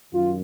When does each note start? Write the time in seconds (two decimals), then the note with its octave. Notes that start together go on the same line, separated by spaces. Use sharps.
0.13 F#2 D#3 F4